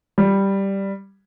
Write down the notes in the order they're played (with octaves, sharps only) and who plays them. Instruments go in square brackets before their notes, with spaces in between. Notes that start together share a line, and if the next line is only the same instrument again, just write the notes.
[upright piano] G3